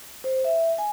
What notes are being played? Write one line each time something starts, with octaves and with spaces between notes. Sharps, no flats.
C5
E5
G#5